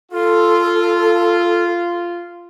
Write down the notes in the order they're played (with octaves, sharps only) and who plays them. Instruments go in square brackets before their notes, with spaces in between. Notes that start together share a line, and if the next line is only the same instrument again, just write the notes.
[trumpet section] F4 [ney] A4